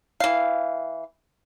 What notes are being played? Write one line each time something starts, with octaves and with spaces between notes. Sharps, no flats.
E3 F5